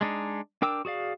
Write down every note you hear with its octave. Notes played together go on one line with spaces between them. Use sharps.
G#3 D4 D#4
D4 A#4 G5 D6 E6
F#4 G#4 D5 F5